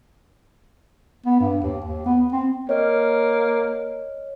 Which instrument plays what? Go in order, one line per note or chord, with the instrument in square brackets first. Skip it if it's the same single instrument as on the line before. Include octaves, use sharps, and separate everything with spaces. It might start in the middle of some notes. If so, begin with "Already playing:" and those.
[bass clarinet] B3
G2
D#2
D#2
B3
C4
[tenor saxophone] A#3 [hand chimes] C#5 D#5 F6